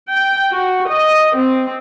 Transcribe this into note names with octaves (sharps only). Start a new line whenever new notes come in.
G5
F#4
D#5
C4